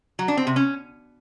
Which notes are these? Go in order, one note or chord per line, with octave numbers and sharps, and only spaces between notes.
F#3
D4
C4
C3
C#4